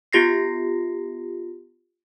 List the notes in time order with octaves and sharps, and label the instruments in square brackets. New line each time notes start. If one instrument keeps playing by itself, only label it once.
[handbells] B3 F4 G4 A#6 C7